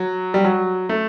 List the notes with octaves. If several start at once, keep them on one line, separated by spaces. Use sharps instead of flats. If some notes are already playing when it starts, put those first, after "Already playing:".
Already playing: F#3
G3
F#3
A3